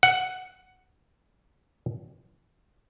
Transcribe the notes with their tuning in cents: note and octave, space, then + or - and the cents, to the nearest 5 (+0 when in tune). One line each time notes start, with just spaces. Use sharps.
F#5 +5